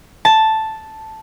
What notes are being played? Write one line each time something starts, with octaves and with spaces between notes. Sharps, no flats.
A5